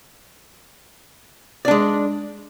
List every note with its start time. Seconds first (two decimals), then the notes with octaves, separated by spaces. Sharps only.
1.65 D5
1.68 D4
1.71 G#3